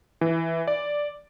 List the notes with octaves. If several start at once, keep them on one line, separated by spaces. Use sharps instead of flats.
E3
D5